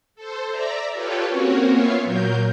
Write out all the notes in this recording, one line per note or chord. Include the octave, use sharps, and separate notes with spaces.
A4 C5
D5 E5 A#5
F4 G4 A4 B4 C#5
A#3 C4 C#4 F#4 A#4 C#5
B3 F4 C#5 E5 F5
A#2 F#3 A#4 G6